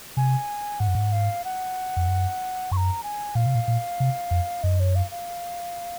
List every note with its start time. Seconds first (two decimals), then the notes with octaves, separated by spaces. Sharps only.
0.17 C3 G#5
0.80 G#2 F#5
0.88 F#2
0.95 G#2
1.12 F5
1.44 F#5
1.97 F2
2.07 F#2
2.71 F#2 C#6
2.77 A#5
3.03 G#5
3.35 A#2 F5
3.46 C3
3.55 A#2
3.68 A#2
4.00 C3
4.31 F2
4.63 F#2 D#5
4.80 C#5
4.95 F5
5.11 F5